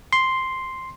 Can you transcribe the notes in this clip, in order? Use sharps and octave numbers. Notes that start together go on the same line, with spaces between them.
C6